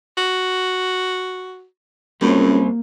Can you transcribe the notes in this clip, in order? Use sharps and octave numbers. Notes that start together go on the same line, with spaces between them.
F#4
C#2 F#2 G3 A#3 C4